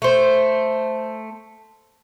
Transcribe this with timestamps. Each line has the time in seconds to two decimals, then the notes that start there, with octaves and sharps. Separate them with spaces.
0.02 A3 C5